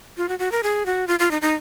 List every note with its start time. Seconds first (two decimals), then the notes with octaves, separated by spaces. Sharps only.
0.17 F4
0.29 F#4
0.39 F#4
0.52 A#4
0.63 G#4
0.86 F#4
1.07 F4
1.19 F4
1.31 D#4
1.42 D#4